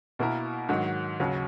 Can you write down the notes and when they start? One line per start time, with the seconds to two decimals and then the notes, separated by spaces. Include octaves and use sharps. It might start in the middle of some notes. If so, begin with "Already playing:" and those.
0.19 B2 A#3 E4 A#4
0.69 G#2 D#3 F#3
1.20 D#2 C#3 F#3